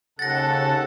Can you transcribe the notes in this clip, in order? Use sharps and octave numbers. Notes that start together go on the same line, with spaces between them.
D#2 C#3 A4 F#5 A6 A#6